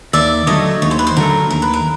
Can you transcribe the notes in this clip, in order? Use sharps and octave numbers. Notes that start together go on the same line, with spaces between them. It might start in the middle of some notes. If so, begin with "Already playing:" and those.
D#2 D5 E5
D3 F#3 A3 C#5 D#5
D#2 C#5
C5
B4
C5
D3 F#3 A3 A#4
D#2 A#4
B4
A#4